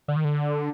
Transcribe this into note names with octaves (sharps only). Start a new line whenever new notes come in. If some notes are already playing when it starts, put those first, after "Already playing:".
D3
D#3
D3